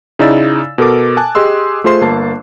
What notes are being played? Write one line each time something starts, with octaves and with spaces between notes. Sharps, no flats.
C#3 D#4 E4 D5 E6 A6
B2 A4 A#4 D6
G#5 A5 F#6
G4 G#4 D#5 C6 E6
A3 F4 G#4 C5 C6 C7
G1 A#3 A5